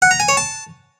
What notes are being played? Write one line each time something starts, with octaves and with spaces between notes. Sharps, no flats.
F#5
A#5
G#5
C#5
A5